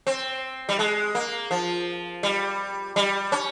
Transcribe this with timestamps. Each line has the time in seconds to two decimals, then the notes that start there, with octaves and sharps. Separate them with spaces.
0.07 C4
0.69 G3
0.79 G#3
1.15 A#3
1.51 F3
2.23 G3
2.96 G3
3.32 C#4